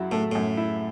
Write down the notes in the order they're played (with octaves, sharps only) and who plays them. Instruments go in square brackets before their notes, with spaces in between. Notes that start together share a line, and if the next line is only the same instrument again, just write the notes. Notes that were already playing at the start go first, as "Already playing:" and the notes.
Already playing: [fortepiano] F#2 F#3 E4
[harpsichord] A2 [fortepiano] A3
[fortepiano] F#2 [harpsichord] A2
[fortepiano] E4